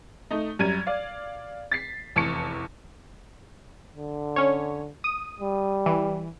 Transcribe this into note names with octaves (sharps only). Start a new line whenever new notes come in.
A3 D#4
F#2 G3 A#5 G#6 D#7
D5 F5
A6 B6 C7
F1 E2 A5 C#6 C#7
D3
C#4 C#5
D#6
G3
E3